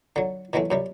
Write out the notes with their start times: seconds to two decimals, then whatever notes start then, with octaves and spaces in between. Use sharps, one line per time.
0.16 D3 F#3
0.53 B2 E3 F#3 G#3 A3
0.71 F#2 C3 G3